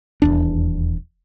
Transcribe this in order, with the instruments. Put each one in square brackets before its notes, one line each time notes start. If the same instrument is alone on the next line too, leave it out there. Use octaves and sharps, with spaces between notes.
[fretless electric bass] D#1 E2 D4